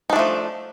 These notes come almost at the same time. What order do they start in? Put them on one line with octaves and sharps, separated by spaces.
D#4 D4 A3 F3